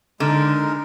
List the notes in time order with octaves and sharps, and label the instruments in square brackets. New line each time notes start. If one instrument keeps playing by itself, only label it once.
[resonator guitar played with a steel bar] D3 [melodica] G#3 D#4 A#4